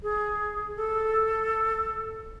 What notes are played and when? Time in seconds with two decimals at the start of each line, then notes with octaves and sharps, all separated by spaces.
0.03 G#4
0.76 A4